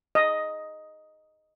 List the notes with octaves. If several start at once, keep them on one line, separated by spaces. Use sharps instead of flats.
D#5